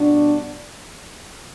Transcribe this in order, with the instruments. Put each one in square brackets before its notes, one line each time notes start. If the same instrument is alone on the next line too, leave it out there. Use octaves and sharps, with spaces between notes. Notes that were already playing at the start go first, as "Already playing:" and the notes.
Already playing: [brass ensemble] B2 G3 D4 F#4